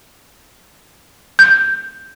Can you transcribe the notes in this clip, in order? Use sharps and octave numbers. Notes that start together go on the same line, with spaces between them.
G6